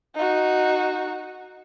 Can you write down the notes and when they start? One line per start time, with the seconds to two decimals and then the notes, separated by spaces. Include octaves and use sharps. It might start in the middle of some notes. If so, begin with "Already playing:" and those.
0.14 D#4 F#4